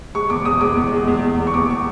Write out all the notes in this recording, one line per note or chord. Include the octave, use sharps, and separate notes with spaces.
G#3 C#6
E2 D6
E2 D#6
G#3 D6
E2
G#3
E2
E2
E2
C#6
E2 D6
C#6